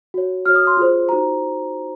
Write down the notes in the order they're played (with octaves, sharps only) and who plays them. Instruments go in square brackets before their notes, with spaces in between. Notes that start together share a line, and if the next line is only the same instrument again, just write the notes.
[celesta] F#4 C#5
F#4 C#5 F6
D#6
C6
F4 G#4 C5
D#4 F#4 C5 A#5